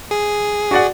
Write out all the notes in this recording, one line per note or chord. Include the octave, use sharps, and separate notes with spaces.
G#4
F#4 D5 F#5